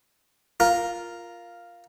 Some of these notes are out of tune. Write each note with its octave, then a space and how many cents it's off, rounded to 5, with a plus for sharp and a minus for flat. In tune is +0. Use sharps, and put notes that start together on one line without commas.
F4 +0 A#4 +0